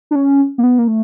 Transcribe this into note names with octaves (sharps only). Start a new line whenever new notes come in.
D4
C#4
A#3
B3
A#3
A3